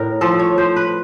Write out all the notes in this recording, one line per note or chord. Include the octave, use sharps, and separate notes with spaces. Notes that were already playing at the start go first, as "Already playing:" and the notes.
Already playing: A2 A#4
F3 A4
C#5
F3 C5
B4